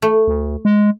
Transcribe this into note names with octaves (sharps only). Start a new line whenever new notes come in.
A3
D2
G#3